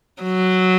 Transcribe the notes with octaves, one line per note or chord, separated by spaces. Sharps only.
F#3